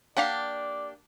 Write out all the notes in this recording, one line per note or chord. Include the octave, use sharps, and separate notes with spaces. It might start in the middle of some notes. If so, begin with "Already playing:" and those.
A#3 D4 G4 D5 F5 F#5